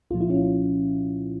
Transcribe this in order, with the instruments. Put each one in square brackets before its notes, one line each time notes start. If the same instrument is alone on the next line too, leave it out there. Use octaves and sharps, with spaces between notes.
[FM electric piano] C2 A#2 F3 F4
E4
C#4 F4